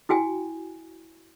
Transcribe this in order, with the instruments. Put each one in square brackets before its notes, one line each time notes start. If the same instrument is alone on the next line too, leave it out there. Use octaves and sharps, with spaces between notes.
[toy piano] E4 F#4 G5 G#5